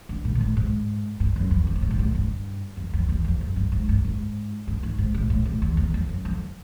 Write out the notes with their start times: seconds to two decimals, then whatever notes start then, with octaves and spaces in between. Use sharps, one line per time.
0.09 D3
0.25 A#2
0.35 A#2
0.41 A2
0.57 G#2
1.20 G2
1.36 F#2
1.51 F2
1.67 G#2
1.76 A#2
1.82 A2
1.90 G#2
1.99 A2
2.15 G2
2.77 F2
2.93 F2
3.09 E2
3.24 F2
3.41 F#2
3.56 G2
3.72 G#2
3.89 G2
4.05 G#2
4.67 G2
4.83 G#2
4.98 G#2
5.14 A2
5.30 A2
5.45 A2
5.62 E2
5.77 E2
5.94 F2
6.09 F#2
6.25 F2